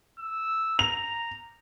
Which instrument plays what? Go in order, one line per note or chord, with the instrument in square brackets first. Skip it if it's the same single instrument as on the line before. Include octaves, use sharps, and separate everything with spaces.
[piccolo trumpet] E6
[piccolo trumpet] A#5 [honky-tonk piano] F7